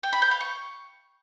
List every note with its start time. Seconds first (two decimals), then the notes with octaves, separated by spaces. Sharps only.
0.03 G5
0.13 B5
0.22 G6
0.31 F5
0.40 C#6